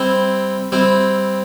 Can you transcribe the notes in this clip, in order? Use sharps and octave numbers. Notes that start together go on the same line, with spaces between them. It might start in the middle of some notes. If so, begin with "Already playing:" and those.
Already playing: G3 C4 E4
G3 C4 E4